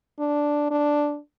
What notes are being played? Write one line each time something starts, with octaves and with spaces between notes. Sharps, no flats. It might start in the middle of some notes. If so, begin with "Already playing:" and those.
D4
D4